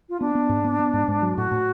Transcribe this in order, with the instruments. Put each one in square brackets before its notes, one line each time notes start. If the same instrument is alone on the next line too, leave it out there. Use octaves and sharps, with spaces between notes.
[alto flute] F4
[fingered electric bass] B3 [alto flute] D4
[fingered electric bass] B3
G#2
B3
B3
G#2
G#2
F#3
[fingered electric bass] A2 [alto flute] F#4
[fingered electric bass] A2